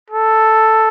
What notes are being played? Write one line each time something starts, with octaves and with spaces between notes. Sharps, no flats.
A4